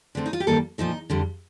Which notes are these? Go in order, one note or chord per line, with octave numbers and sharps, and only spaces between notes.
D3 A3 C4
D#4
F4
G4
G2 D#3 G3 A#3 A4
A#2 F3 A3 D#4
F2 D3 G3